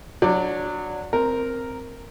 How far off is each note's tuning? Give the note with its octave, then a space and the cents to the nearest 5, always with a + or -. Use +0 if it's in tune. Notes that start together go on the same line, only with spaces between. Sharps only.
F#3 -15 D4 +0 D5 +0
C4 +0 A#4 +0